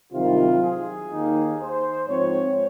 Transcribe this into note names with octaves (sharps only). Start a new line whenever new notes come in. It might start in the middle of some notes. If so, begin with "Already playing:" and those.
C2 C3 D#3 F#3 F4
G#4
D#2 D#3 A#3 D#4
C5
G#2 F3 C4 C#5